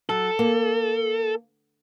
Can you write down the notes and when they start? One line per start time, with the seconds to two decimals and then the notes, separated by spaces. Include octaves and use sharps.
0.09 F#3 A4
0.39 A#3